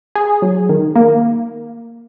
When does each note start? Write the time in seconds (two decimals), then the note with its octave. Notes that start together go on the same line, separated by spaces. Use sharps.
0.15 G#4
0.42 F#3
0.69 D#3
0.96 A#3